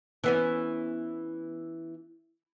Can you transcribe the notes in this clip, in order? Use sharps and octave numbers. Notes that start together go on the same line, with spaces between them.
E3 B3 C#4